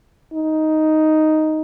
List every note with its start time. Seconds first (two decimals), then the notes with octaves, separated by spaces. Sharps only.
0.33 D#4